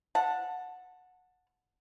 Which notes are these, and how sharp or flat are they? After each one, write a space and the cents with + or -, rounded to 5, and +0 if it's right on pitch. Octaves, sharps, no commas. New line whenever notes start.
F#5 -15 A5 +10